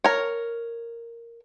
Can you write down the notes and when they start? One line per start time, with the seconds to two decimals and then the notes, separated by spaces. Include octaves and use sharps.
0.04 A#4 C#5